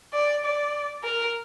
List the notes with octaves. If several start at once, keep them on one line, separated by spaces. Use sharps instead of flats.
D5
D5
A#4